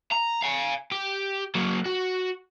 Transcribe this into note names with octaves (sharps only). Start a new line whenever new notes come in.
A#5
F5 G#5
G4
F#3 A#3
F#4